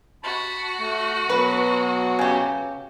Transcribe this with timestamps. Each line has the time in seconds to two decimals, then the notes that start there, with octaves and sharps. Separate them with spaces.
0.23 F#4 A5 B5
0.80 A3
1.29 B2 F#3 B4
2.19 C#3 G4